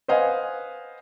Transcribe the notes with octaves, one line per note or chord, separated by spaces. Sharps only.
B4 C5 D#5 F5 F#5 G#5